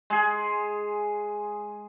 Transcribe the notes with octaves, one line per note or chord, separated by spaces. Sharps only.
G#3 G#4